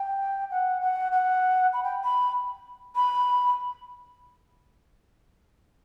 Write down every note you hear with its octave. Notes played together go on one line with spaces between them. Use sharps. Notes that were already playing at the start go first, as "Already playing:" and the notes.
Already playing: G5
F#5
F#5
F#5
B5
G5
B5
B5